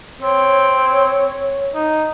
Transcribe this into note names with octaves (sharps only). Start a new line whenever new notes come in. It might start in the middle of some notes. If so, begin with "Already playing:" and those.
C4 C#5
D#4